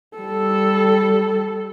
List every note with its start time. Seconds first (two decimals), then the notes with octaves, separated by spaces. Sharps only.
0.17 G3 A4